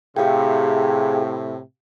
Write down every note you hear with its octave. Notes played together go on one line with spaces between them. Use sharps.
A2 C3 G4 G#4 F5 G5